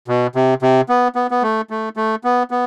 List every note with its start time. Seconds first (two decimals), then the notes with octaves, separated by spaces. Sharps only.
0.08 B2
0.35 C3
0.62 C3
0.89 B3
1.15 B3
1.31 B3
1.42 A3
1.70 A3
1.97 A3
2.24 B3
2.51 B3